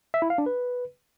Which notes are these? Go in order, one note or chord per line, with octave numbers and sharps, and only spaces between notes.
E5
E4
F5
D4
B4